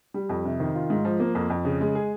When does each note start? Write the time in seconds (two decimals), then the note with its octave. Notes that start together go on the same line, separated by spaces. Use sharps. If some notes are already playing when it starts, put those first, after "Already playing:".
0.14 G3
0.29 F2
0.45 C3
0.60 D#3
0.75 F4
0.90 G#2
1.05 F3
1.20 A#3
1.35 F2
1.50 F2
1.65 C#3
1.81 G#3
1.95 G#4